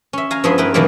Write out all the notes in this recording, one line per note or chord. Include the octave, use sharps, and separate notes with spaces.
C#4 E5
F5 G#5 A#5
G2 F3 G#3 B3 G#4 E5
D#4 E4 A#4 B4
B2 D#3 E3 F#3 G3 A#3